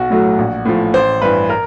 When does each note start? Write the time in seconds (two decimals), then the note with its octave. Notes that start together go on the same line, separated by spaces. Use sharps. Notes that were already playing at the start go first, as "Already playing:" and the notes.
Already playing: B1 F#4
0.10 A2 F#3 A3
0.38 A#1
0.65 A2 F3
0.94 A1 C5
1.22 G2 E3 B4
1.50 A#4